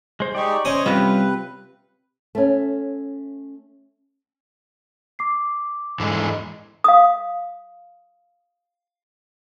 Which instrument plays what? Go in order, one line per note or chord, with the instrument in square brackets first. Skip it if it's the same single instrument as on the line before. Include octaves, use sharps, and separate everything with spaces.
[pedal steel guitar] G#3 C5
[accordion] G#3 D#4 G4 [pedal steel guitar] D5 C#6
[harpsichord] C#4 D#6 [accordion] C5 C#5 D#5
[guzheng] C3 G4 [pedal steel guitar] G3 F4 [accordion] B4
[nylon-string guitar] A3 C#4
[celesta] D6 C7
[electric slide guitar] G#2 D3 E3 [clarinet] G#3
[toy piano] F5 D#6